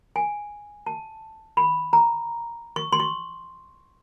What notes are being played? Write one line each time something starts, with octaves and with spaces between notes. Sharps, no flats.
G#5
A5
B5
A#5
C#6
C6
C#6